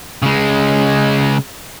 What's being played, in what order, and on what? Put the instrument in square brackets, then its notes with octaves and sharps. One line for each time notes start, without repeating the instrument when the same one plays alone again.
[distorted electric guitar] C#3 G#3